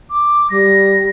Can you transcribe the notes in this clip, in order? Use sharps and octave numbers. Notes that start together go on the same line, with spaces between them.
D6
G3 A#6